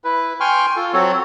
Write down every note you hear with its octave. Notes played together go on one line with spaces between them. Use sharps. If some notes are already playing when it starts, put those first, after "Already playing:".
E4 B4
G5 G#5 C6 C#6 F6
F4 A4
F#3 C4 F#4 A4 C#5